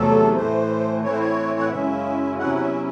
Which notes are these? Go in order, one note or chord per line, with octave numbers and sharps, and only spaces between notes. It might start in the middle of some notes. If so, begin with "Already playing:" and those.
Already playing: E2 C3 F#3 A3 A4
A2 E3 A3 C5
A2 E3 C4 E4 C#5
C5
C#5
F#5
F#2 C#3 G#3 C#4 E4 E5
E2 C3 F#3 C#4 E4 F#5
F#5
E5